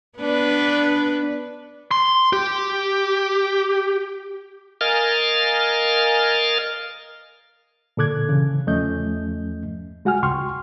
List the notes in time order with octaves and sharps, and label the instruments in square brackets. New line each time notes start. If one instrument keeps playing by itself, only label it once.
[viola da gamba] B3 D4 B4
[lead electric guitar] C6
G4
[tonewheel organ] A#4 D#5 F5 G#5 F6 A6
[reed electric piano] A#2 D3 A4 D6 F#6 G#6
C#3 E3
E2 F3 A3 C#4 D#5 G6
G#3 F#4 F#5 G#5 F6
C#2 G5 C6 C#6 F6